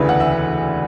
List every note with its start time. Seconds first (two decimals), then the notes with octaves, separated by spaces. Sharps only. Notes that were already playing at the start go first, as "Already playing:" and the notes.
Already playing: E1 D2 C#3 E3 B4
0.09 F#5
0.20 E5